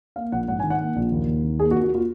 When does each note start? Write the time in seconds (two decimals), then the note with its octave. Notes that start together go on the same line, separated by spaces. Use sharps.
0.16 A#3 F5
0.32 A#1 F#5
0.48 G#2 F#5
0.59 D#3 G#5
0.70 F#5
0.80 A#3
0.96 A#1
1.12 D#2
1.27 D#2
1.44 D#3
1.59 A#3 G#4
1.71 F#4
1.75 D#2
1.84 F#4
1.95 F4